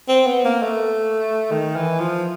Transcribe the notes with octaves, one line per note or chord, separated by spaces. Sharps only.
C4
B3
A#3
A3
D#3
E3
F3